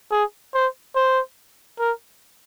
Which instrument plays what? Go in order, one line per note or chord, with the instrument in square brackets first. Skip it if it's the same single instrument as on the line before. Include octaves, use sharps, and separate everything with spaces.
[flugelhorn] G#4
C5
C5
A#4